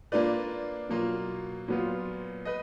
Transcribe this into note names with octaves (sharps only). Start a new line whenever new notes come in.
A#3 D4 F4 B4 D5
B2 F#3 A#3 F4
A#2 F#3 B3 F4
B4 D#5